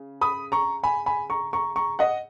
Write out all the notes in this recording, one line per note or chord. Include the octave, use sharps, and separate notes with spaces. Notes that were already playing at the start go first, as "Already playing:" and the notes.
Already playing: C#3
B5 D#6
A#5 C#6
G#5 B5
G#5 B5
A#5 C#6
A#5 C#6
A#5 C#6
D#5 F#5